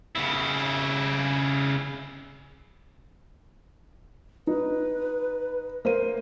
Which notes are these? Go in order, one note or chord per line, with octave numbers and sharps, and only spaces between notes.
C#3 E4
D#4 B4
A#3 C5 D#7